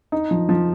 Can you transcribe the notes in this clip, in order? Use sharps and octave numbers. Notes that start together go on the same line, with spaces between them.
D#4
F3
F3